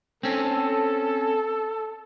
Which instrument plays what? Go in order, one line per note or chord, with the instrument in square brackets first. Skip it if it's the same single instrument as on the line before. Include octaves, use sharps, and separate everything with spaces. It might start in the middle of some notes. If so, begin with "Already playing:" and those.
[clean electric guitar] C4 C#4 [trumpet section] A4